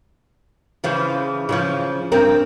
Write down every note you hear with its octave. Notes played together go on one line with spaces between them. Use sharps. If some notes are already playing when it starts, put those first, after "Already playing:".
C#3 E3 F3
C#3 E3 F3
G2 C4 A#4